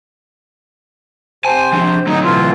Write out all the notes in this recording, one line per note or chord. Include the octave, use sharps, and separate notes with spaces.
C3 C5 G#5 A5
F3 D4
D2 F#3 D#4
B2 E3 F4